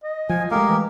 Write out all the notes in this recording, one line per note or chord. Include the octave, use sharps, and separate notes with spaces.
D#5
F3 G#5
G#3 A3 D#4 G4 A#4 F5
E3